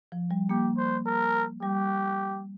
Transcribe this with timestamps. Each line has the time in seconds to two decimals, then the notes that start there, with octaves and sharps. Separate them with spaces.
0.12 F3
0.31 G3
0.49 A#3 G4
0.77 C5
1.06 A#4
1.62 G3 G4